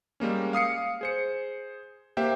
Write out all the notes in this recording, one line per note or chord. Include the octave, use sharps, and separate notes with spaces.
G3 G#3 A#3 C#4
F5 D#6 C7 C#7
G#4 C5 C#7
A#3 G4 C5 E5 G5